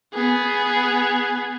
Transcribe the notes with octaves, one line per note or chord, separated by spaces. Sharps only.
B3 G#4